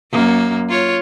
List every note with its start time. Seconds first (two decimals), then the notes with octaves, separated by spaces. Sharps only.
0.12 F#2 A#3
0.69 F4 C#5